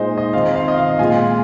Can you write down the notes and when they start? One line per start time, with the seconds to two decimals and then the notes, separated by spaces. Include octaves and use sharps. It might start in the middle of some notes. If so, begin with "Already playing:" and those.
Already playing: A#2 G#3 D#4 C5 D#5
0.17 D#5
0.33 D#3 C4 F4 F5
0.56 F5
0.68 D#5
0.78 F5
0.99 A#2 G#3 F4 G#5